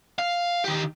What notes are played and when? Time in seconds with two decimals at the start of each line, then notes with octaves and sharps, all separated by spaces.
0.19 F5
0.65 D#3 G4